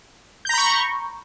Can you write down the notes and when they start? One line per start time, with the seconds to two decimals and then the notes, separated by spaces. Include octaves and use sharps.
0.45 G6
0.49 A#5
0.53 B5
0.58 C#6